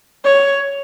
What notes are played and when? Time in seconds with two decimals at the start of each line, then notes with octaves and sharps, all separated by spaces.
0.25 C#5